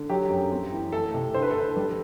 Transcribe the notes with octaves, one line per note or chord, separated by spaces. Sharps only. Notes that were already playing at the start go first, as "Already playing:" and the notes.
Already playing: D3
F#3 G4
F#2
C4
E3
A3 A4
C3
D3 C5
B4
A4
D3 B4
G3